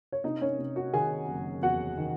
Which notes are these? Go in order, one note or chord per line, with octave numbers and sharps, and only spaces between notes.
C#5
C3 D#4 D#5
C#4 C#5
C3
F#4 F#5
D#3 G#4 G#5
F#1
E2 F#4 F#5
D#3